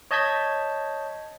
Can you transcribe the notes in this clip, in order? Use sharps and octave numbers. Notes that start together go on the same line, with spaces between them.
C#5 D#5 A5 G6 G#6 B6